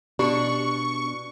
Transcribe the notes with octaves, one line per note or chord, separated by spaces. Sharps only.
B2 D4 G4 C#6